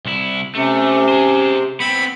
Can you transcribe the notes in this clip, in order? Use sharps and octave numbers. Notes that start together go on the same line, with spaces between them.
C2 E4
C3 A3 C#4
G#4 C5
B3 C4 B5